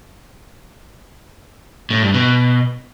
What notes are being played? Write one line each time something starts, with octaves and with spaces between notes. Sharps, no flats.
A2
G2
B2